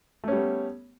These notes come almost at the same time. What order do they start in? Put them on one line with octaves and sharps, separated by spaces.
A3 C#4 G3 B3